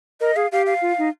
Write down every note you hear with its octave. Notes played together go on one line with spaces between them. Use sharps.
A#4 D#5
G#4 F5
G4 F5
F5
F4
D#4